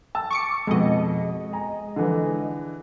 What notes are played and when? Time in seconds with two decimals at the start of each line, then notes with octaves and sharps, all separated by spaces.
0.15 A5 E6
0.31 C#6 D6 C#7
0.67 F2 B2 G#3 D#5
1.53 G#5 A#5
1.96 D3 E3